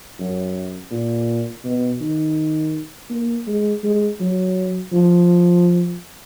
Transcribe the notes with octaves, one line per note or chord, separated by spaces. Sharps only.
F#2
A#2
B2
D#3
A#3
G#3
G#3
F#3
F3